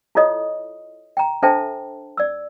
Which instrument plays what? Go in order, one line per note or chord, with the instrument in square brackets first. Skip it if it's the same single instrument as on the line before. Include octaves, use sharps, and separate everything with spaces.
[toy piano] E4 F4 A4 C#5 D#5 D#6
G5 A#5
D4 A4 C5 E5 G5 A5
D5 E6